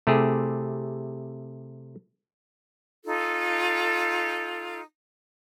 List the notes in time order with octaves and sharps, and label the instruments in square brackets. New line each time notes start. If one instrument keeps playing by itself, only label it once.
[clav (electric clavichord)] C3 A3 E4 G4 G#4
[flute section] D#4 F4 A4